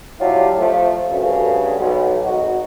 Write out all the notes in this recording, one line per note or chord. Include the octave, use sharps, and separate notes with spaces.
C3 F#3 D4 E4 F4 G4
F3 A3
D2 G2 C#3
B1
G#1 D#4 F#4